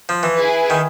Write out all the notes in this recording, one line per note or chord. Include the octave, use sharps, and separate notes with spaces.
F3
E3
E4 G#4 B4
D#3